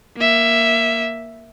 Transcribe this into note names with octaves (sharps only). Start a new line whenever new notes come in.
A#3 E5